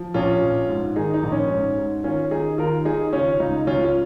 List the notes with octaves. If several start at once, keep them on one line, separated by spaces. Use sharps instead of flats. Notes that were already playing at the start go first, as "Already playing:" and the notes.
Already playing: F3
A#1 C#4 F4
A#1
G#2
D#3 D#4 G#4
D#4
A#1
C#4
G#2
G#2
D#3 C#4 F4
D#3 D#4 G#4
D#2 F4 A#4
D#3 D#4 G#4
C#3 C#4 F4
C#2 D#4
C#2 C#4 F4
F4